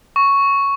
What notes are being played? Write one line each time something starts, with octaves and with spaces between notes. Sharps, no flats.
C#6